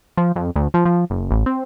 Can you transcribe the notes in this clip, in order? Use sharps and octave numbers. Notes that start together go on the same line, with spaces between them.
F3
F2
D2
F3
F3
F#1
A1
C4